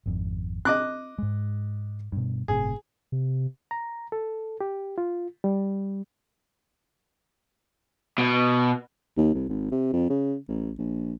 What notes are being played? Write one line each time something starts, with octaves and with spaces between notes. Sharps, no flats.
G#1 F2
C4 D#5 D6 F#6
G#2 G#3
G2 B2
G1 A2 C3 G#4
C3
A#5
A4
G4
F4
G3
B2
D#2
C2
G#1
C3
F2
C#3
A1
A#1